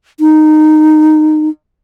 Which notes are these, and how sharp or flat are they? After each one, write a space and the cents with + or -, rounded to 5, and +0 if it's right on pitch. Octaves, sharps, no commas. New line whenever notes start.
D#4 -15